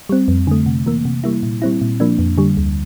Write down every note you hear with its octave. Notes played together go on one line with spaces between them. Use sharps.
G3 C4
F2
D3 A3
C3
E3 A#3
C3
G3 A#3 E4
A#2
G3 C4 E4
A#2
F3 A#3 D4
F2
D3 G3
D2